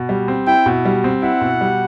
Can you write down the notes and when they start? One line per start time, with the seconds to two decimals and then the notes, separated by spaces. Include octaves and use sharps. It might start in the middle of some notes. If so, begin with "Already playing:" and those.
Already playing: B2
0.09 G3
0.28 C4
0.47 E4 G5
0.66 B2
0.85 G3
1.04 C4
1.22 E4 F#5
1.41 B2
1.61 G3